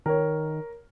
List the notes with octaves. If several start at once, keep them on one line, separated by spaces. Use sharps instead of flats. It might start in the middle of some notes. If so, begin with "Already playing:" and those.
D#3 A#4 C#5